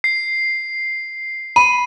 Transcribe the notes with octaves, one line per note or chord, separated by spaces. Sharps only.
C7
B5 D#7